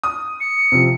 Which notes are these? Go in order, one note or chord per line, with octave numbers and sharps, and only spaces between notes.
D#6
C#7
C3 F3